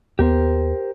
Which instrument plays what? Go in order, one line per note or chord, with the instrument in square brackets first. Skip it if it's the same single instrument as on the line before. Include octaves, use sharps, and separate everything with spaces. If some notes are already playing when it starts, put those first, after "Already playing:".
[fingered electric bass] D#2 B3 [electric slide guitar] G4 A#4 C5